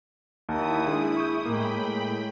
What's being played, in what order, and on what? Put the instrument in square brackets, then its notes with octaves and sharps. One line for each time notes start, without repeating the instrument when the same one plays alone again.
[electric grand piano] D#2 D#4 A5 [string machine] E4 D#6
[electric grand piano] G#3 D4 G#4
C#6 G6
[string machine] A2 G5 B5 [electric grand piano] G#3 A#3